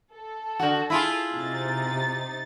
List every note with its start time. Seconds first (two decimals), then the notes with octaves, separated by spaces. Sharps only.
0.12 A4
0.59 D3 F#4
0.90 E4 F4 G#4
1.36 C3 D#4 A6